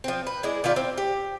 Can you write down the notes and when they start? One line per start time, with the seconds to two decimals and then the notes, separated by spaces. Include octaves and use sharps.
0.04 F3 C4
0.27 B4
0.43 G#3 D4 E4
0.64 D#3 E4 F4 D5
0.76 C4
0.98 G4